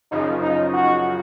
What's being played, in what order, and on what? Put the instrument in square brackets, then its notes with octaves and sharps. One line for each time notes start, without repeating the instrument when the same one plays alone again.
[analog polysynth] F#2 C#3 F3 [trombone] D#4
[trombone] D#4
F#4